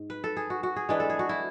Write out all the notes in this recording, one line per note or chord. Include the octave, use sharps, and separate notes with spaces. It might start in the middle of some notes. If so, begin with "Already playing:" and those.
Already playing: G#2
B4
A4
G#4
F#4
F#4
G#4
E3 G#3 D4 B4
A4
G#4
F#4
E4